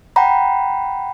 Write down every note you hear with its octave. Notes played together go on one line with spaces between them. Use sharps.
F#5 G5 A#5 B5